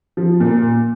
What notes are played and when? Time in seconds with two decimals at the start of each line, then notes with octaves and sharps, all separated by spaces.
0.17 F3
0.40 A#2